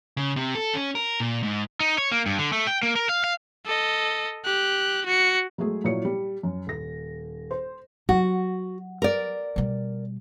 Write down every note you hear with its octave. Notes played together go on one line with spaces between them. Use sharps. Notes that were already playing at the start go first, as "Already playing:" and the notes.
C#3
C3
A4
C#4
A#4
A#2
G#2
D#4
C#5
A#3
G2
D3
A3
G5
A#3
A#4
F5
F5
A4 D#5
G4 F#6
F#4 C#7
F#3 G#3 A3 G#4
A#2 F#3 E4 C#5 C#7
G3
F#2
D#1 A#6
C5
F#3 F#4
A#4 D5
B2 G3